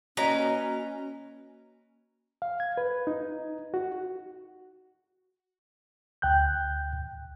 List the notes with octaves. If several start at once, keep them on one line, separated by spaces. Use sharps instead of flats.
A#3 C#4 F#4 B4 C#5 D#5 A#5
F5
G#6
B4
D#4
F#4
D2 G5 F#6 G6